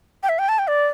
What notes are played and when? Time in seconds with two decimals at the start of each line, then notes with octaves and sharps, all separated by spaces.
0.23 G5
0.29 E5
0.39 G5
0.49 A5
0.59 G5
0.68 D5